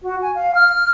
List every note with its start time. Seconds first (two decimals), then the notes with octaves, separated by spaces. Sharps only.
0.02 F#4
0.21 G#5
0.34 F5
0.54 F6